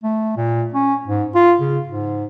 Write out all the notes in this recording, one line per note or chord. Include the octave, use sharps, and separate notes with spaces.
A3
A#2
C#4
G#2
F4
C#3
G#2